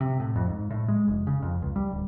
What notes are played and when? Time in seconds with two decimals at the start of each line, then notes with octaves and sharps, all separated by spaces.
0.01 C3
0.20 A2
0.36 F2
0.48 G#2
0.70 A2
0.88 G#3
1.08 F1
1.27 C#3
1.42 F2
1.62 C#2
1.76 G3
1.91 D1